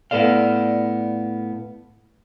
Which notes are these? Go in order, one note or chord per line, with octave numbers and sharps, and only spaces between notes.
A2 B3 A4 D5 F5